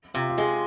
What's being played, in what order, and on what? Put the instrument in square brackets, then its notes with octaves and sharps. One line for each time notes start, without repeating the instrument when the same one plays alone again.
[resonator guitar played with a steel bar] C3 [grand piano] F4
[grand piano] F4
[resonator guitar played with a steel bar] G#3 [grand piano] G#4